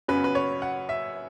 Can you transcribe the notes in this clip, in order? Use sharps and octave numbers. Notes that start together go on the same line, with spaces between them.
F#2 C#3 F#3 B3 B4
B4
C#5
F#5
E5